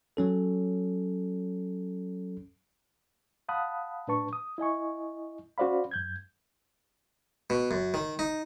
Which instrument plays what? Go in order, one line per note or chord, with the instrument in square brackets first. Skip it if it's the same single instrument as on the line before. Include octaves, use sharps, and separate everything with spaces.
[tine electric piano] F#3 C#4 A4
[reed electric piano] F5 F#5 A5 B5 D#6 F#6
A2 D4 B4 A5 C#6
D#6
E4 D#5 G#5 C#6
C#4 F#4 C5 D5 F5 B5
F#2 G6 G#6
[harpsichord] B2
F#2
D#3
D#4